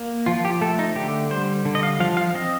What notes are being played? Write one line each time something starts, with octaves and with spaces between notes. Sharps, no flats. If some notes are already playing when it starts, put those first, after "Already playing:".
Already playing: A#3
F3 F4
G4
A3 A4
D#4
D3 G4
G3 C5
D3
D#5
F5
F3 F5
F5
C4 D#5